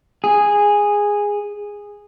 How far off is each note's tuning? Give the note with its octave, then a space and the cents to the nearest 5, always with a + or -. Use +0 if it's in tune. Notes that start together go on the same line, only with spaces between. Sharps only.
G#4 -10